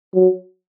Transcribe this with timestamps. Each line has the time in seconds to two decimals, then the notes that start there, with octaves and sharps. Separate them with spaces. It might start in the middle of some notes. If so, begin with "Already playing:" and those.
0.14 F#3